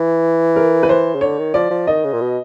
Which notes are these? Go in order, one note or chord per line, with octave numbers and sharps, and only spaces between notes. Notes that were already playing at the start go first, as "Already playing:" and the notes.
Already playing: E3
A#4
B4
C5
C#3
D3 C#5
D#3
F3 D5
F3
D#3 D#5
C#3
A#2
B2